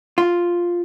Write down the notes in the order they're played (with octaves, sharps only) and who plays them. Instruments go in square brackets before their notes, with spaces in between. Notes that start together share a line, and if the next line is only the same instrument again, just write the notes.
[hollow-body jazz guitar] F4